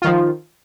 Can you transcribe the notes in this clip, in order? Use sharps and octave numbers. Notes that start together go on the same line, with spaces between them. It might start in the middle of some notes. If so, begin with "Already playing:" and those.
D#3 F3 F4